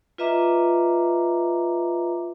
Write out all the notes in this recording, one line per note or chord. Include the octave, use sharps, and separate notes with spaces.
F4 B4 D#5 E5 A#5 D6